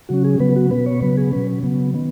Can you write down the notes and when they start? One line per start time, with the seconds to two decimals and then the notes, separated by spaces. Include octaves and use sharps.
0.09 C#3 F#3 C#4 F#4
0.24 G#4
0.40 C#3 F#3 B3 B4
0.56 F#4
0.71 B2 B3 B4
0.86 C#5
1.01 C#3 F#3 B3 B4
1.17 G#4
1.32 B2 F#3 C#4 B4
1.63 C#3 F#3 B3
1.94 D#3 B3